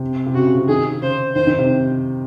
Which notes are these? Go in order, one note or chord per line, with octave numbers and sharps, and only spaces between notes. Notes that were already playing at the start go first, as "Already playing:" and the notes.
Already playing: C3
C3
C#3 F#4
C#3
C3
D#3 G#4
C#3 C5
D#3 C5
D#3
C3